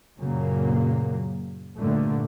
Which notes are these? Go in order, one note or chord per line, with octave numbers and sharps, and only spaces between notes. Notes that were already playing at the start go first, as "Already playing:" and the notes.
F#2 A#2 C#3 F#3 A#3
G2 A#2 D3 A3